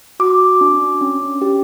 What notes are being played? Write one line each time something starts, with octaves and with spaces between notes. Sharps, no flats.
F#4 D6
D4
C#4
G4